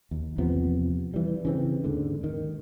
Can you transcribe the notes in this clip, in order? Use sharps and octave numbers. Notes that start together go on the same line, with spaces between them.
D#2
E2 C3 F3 B3
E3 G3
C#3 E3 C4
D#2 G#2 D3
D#3